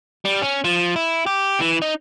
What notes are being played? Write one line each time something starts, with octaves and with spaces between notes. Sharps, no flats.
G3
C#4
F3
E4
G4
E3
D#4